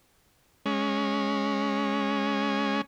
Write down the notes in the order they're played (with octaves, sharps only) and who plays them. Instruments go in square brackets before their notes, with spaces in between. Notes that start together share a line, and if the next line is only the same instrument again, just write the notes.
[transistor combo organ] G#3 C#4